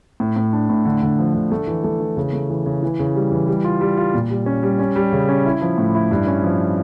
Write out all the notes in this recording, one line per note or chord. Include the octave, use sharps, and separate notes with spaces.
A2
A2
D4
A2
D3
D3
F3
D3
A3
E3
A3
E3
C#3
A3
E3
C#3
E3
C#3
G3
E3
G3
F4
G3
F4
A#2
G3
C#4
G3
C#4
G3
C#3
C#4
E4
F3
A2
E4
G2
C#4
F3